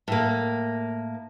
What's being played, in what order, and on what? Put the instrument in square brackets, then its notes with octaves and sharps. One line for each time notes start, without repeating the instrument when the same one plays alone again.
[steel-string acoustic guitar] A2 A#3